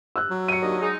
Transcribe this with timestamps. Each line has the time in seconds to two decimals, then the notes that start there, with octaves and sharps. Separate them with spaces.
0.16 E6 F#6
0.30 F#3
0.48 C#7 D#7
0.61 D#2 D3 D#5
0.81 G#3 D#4